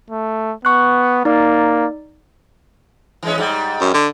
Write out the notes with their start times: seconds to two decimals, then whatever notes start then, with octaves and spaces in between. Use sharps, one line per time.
0.10 A3
0.65 B3 C#6 F#6
1.25 A#3 D#4 D5
3.23 E3 G#3 C#4
3.38 G#2 G3
3.81 F#2
3.94 D3